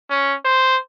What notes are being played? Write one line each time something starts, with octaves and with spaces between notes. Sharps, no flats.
C#4
C5